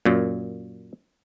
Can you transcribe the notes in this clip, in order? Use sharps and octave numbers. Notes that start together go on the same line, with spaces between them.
F#2 A#2